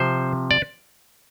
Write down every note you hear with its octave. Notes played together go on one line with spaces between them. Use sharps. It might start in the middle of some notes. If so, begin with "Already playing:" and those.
Already playing: C3 F3 C5
D5